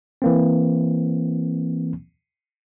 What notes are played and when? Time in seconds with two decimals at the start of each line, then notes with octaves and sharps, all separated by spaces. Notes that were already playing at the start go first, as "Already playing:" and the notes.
0.22 E3 A#3 C4